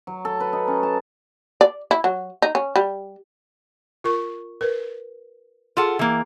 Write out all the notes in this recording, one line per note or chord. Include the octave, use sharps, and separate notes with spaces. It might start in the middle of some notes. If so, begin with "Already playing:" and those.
F#3
A4
B4
D#4
C#4
A5
D5
E4
F#3
D#4
C#4
G3
F4 A#4 C#6
A#4 B4
F4 G#4 A4 F#5
E3 A#3